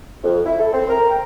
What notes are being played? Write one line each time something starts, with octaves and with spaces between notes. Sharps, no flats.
F2
E4
A4
C4
A#4
G5